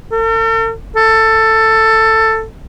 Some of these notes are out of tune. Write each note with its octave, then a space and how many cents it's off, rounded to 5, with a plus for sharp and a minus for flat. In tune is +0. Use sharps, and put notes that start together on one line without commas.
A4 +45
A4 +15